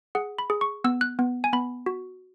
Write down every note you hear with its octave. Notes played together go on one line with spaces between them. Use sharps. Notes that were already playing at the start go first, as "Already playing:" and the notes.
G#4 F#5
B5
G#4
C#6
B3 E6
F#6
B3
G#5
B3 B5
F#4